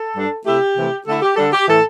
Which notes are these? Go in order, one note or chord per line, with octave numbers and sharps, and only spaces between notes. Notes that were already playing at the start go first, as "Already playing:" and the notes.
Already playing: A4
G2 G3 D4
C3 A3 E4 G4
C3 E3 A3 E4
D3 A3 E4 A4
G4
D3 G3 D4 A4
G4
A2 E3 A3 A4